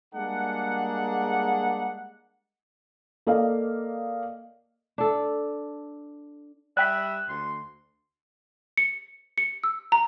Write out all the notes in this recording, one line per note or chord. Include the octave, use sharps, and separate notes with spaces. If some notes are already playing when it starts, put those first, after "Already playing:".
G3 G#3 A#3 D4 G#4 F#5
A#3 A4 D5 D#5 F5
D4 A4
G3 D5 E5 G5 F#6 B6
D2 C6
C#7
C#7
E6
A#5